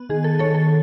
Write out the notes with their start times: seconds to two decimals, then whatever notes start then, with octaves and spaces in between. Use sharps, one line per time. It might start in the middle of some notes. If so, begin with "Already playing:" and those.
Already playing: B3
0.09 D#3 G#4
0.24 A4
0.39 D#3 A4 C#5
0.55 A4